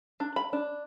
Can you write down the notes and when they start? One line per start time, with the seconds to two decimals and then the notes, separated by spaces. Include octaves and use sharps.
0.20 D4
0.36 B5
0.53 D4